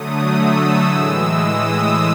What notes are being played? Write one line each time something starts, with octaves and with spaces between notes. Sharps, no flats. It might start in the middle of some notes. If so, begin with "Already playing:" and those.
Already playing: D3 F#3 A3 D#6
E6
A2 E3 G#3 E6
D#6